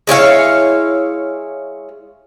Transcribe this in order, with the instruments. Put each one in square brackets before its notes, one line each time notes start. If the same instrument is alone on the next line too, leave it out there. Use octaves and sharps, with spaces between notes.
[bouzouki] G#3 E4 C#5 F5